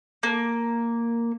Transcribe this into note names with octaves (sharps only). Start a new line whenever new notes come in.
A#3